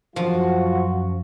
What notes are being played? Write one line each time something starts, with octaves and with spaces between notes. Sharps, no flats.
F#2 F3 F#3 F4 F#4